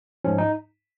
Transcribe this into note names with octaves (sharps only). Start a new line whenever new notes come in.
G#2 F3 C#4
D#4